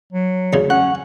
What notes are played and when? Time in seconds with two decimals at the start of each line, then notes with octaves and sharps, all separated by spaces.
0.13 F#3
0.53 D2 C#3
0.70 C#4 F#5